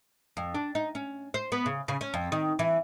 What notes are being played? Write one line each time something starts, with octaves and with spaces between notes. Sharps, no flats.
F2
D4
D#4
C#4
C5
B3
C#3
C#3
C#4
F2
D#3
E3